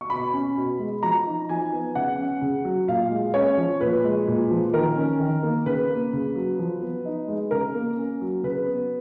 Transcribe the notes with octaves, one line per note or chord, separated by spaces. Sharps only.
C#6
B2 B5
C#4
B2
G#3
F3 A#5
D#4
F3 G#5
B3
C#3 F#5
C#4
C#3
F#3
A#2 F5
G#3
C#4 C#5
F3
A#2 B4
G#3
A#2
F3
D#3 A#4
C#4
D#3
A#3
C#3 B4
A#3
C#3
F#3
F3
B3
D#4
G#3
C#3 A#4
A#3
C#4
F#3
C#3 B4
B3